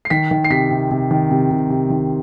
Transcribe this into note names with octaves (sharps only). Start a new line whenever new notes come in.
C7
D#3 B6
D#3
C7
C3 B6
C3
C3
D#3
C3
C3
C3
D#3